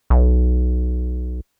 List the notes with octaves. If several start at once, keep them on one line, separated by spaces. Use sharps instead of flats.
B1